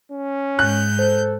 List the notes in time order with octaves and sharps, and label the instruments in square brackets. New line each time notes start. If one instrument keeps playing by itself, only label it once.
[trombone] C#4
[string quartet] G#2 G6 [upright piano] F#6
[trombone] A4 [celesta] C5